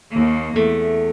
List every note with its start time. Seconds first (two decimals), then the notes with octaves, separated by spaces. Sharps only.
0.10 D#2 A#3
0.56 E2 A3